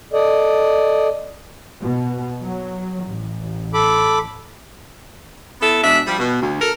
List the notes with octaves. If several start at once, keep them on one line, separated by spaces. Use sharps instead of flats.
A4 D5 D#5
B2
F#3
A1
A4 B5 D6
B3 E4 A4
B2 G#3 D4 E5
F3 G3
B2
D2
A4 A#4